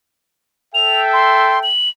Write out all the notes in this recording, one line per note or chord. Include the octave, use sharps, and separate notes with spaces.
A4 E5 G5 F7
C6
F#7